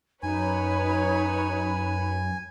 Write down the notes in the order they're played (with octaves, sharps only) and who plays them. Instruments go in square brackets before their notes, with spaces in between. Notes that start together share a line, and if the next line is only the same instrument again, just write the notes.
[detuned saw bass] F#2 [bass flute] D#4 [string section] B4 C#5 [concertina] G#5